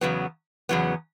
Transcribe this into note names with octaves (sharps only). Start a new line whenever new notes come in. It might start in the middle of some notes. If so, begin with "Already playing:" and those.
E2 C#3 F#3 B3
E2 C#3 F#3 B3